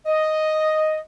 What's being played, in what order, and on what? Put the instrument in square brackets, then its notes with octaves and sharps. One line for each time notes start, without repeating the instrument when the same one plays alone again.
[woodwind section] D#5